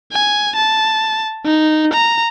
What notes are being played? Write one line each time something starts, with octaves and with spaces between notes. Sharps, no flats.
G#5
A5
D#4
A#5